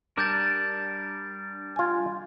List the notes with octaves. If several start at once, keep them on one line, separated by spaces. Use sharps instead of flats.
G3 D4 A#4 D6 G6 A6
F4 G#5